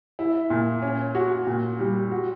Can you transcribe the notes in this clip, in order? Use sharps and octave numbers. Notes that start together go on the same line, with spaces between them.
E4
A#2
C#4
F#4
A#2
G3
F#4